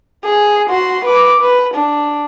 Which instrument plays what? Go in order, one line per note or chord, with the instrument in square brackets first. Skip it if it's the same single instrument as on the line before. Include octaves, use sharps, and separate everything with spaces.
[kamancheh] G#4
F#4 C6
B4 D6
B4
D4